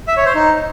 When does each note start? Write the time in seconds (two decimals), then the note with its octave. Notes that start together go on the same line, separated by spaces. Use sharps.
0.08 E5
0.17 C#5
0.26 C5
0.35 D#4